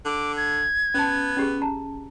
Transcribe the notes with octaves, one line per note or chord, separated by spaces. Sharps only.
D3 D6
G#6
B3 C#4 A5
C#4 G4 G#4
A5 A#5